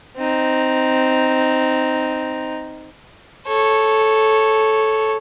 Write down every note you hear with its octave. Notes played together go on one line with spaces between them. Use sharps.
C4 D#4
A4 C#5